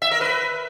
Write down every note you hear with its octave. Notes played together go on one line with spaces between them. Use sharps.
E5
A#4
B4